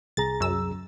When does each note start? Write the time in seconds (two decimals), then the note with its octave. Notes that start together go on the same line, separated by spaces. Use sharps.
0.17 C2 G#4 A#5 A6
0.40 F#2 E6